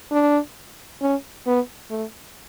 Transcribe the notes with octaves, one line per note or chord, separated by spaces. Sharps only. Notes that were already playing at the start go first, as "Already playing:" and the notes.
D4
C#4
B3
A3